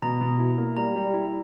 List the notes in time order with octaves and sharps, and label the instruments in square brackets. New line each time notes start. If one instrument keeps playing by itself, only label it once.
[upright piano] B2 [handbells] A#5
[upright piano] B2
E4
A#3
[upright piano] G3 [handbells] A#5
[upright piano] G3
E4